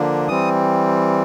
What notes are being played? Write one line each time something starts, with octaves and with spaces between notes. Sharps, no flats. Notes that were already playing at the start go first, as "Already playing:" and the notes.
Already playing: D3 F3 A#3 D4
E3 G3 C4 D#6